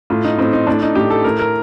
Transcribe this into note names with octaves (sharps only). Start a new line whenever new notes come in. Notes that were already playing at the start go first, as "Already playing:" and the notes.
A2 F4
D#4
A2 C4
D#4
A2 D4
D#4
A2 G4
A4
A2 A#4
A#4